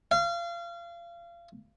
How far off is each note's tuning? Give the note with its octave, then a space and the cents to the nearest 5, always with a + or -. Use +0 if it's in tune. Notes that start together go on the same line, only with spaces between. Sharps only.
F5 -30